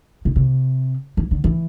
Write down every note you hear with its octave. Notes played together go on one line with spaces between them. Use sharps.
B2
C3
E3
D3
E3